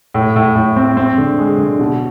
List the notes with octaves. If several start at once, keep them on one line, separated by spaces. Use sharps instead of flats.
A2
A2
A2
C4
C4
D3
G#3
D3
B2